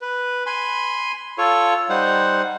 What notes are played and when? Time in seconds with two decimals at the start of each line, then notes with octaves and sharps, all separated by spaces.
0.01 B4
0.46 G#5 B5 C6
1.38 F4 A4 C#5 C#6
1.89 G3 D#4 C5 F#5